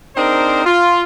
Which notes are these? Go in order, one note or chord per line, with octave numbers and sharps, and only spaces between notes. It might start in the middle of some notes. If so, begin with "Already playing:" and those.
C4 D4 D#4 G#4 A#4 C5
F4